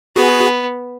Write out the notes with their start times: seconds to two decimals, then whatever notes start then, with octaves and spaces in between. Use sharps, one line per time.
0.16 B3 F#4 G#4